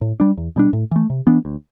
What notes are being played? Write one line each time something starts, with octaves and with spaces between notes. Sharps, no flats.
A2
G3 D4
E2
B2 G3 D4
A2
E3 A3
C3
E3 B3 D4
D2